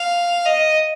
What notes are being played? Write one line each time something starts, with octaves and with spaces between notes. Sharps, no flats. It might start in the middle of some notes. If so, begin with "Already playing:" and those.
Already playing: F5
D#5